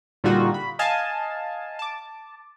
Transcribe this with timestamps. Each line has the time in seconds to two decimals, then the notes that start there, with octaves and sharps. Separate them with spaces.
0.24 A#2 D3 G3 D#4 F4 F#4
0.54 B5
0.79 D#5 F5 G#5 A5
1.79 A5 D6